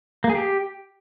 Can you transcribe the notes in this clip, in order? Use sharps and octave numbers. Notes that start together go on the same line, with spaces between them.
A#3
G#4
G4